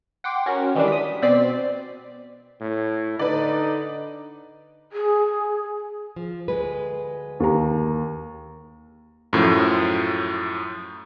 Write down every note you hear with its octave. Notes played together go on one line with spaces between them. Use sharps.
F#5 G5 C6 D6
C#4 F#4 A#4
D#3 E3 G3 G#3 D4
D#6 B6
B2 C4 D5 B6 C7
A2
D3 D#4 B4 D5
G#4
F3
D2 G#3 B4
D#2 A#5
F#2 A2 F3